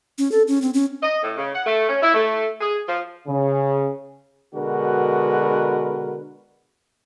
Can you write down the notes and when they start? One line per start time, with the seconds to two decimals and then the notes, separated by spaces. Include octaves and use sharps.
0.18 C#4
0.32 A4
0.47 C#4
0.62 C4
0.74 C#4
1.03 D#5
1.23 A2
1.37 C#3
1.54 F#5
1.66 A3
1.89 C#4
2.02 E4
2.14 A3
2.61 G#4
2.88 F3
3.27 C#3
4.54 B2 D3 G#3 F#4 A#4 B4